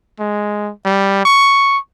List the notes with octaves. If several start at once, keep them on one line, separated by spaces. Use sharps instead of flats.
G#3
G3
C#6